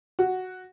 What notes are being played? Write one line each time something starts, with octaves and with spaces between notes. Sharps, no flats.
F#4